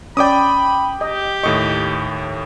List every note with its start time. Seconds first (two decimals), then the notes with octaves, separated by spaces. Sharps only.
0.17 C#4 D5 G5 B5 D6 D#6
1.01 G4 D#5
1.44 D#2 A2 D#5 C#6